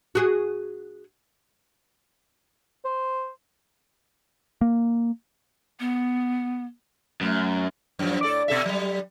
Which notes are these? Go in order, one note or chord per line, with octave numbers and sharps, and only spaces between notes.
F#4 G#4
C5
A#3
B3
F#2 A3
F#2 A2 F3
A2 A4 D5
B2 A4 E5
F#3 G3